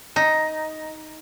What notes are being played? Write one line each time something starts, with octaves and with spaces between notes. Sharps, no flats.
D#4